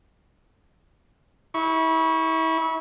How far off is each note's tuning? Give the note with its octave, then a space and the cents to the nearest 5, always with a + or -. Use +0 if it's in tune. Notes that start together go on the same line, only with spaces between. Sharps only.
E4 -30 C#6 +0